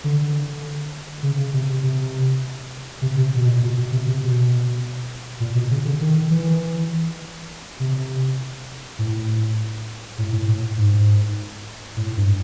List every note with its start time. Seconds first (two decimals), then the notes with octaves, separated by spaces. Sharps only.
0.04 D3
1.23 C#3
1.54 C3
1.83 C3
3.02 C3
3.17 C3
3.36 B2
3.47 A#2
3.61 B2
3.77 B2
3.92 C3
4.07 C3
4.22 B2
5.40 A#2
5.55 B2
5.71 C#3
5.85 D3
6.00 D#3
6.30 E3
7.80 C3
8.99 A2
10.18 A2
10.32 A2
10.48 A2
10.78 G#2
11.97 A2
12.17 G2